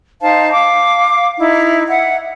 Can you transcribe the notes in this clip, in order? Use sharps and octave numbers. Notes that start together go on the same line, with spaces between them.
D#4 C5 F5 A5
F5 D6
D#4 E4
E5 F#5